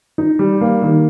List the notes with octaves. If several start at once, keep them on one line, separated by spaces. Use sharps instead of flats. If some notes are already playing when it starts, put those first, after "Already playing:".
D#4
G3
A#3
D#3